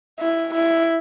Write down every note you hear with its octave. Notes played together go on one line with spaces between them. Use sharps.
E4
E4